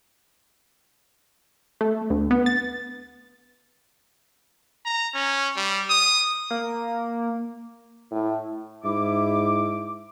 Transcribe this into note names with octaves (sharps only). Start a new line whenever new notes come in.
A3
D2
B3
A6
A#5
C#4
G3
D#6
A#3
A2
G#2 E4 D6